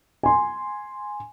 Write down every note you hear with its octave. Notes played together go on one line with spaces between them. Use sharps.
G#5 C6